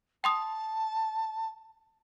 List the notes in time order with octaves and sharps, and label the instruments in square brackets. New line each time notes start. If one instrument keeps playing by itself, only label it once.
[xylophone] G5 C6 D#6 [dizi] A5